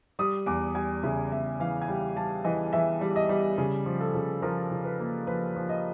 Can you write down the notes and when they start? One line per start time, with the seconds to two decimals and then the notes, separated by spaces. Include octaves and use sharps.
0.19 G3 D#6
0.46 E2 D6
0.75 G3 G#5
1.03 C#3 E5
1.32 E2 E5
1.60 E3 F5
1.82 G#5
1.88 G3 G5
2.16 G3 A5
2.44 E3 D#5
2.73 E3 E5
3.01 G3
3.16 D#5
3.29 G3
3.58 C#3
3.86 F3
4.01 A4
4.14 C#3
4.42 F3 A#4
4.71 C#3
4.85 B4
4.99 A#3
5.27 F3 B4
5.56 F3
5.69 D#5